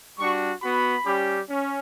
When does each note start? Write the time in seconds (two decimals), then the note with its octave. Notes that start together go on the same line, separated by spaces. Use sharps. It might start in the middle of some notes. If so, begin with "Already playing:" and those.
0.18 G3 D4 F#4 C#6
0.62 B3 F#4 B5
1.06 G3 C#4 G4
1.49 C#4